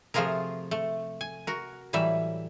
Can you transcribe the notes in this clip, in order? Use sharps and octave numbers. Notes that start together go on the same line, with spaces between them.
C3 F3 A3 F4 G#4 A#4
A3
G#5
F#4 A#4
A2 E3 F#3 G3 E5